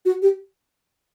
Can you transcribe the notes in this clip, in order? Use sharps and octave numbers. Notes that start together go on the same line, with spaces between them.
F#4
G4